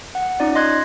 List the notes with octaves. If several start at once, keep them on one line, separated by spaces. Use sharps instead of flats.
F#5
C#4 D#4 F4 D5
D#5 C6 F#6 G#6